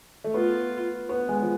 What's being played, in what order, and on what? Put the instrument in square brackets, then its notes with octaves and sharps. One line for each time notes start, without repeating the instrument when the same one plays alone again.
[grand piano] A3
[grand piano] B3 [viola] F4
[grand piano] B3
G#3
F3